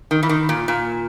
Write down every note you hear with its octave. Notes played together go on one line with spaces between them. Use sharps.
D#3
E3
D#3
A#2
A#2